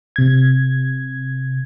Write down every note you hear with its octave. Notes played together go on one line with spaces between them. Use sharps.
C3 G#6